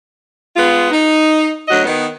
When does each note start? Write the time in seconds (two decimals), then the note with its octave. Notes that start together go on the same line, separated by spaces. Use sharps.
0.55 G#3 B3 F4
0.91 D#4
1.68 D2 F#3 F#4 D#5
1.84 D#3 B3